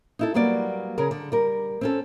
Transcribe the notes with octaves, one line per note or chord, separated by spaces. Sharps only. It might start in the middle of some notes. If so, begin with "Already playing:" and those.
D#4 E4 A4
F#3 G3 A#3 B3 D5
C#3 G#4 A#4
D3
G3 A#4
C4 C#4 A4